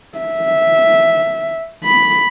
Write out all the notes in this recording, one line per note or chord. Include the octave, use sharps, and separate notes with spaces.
E5
B5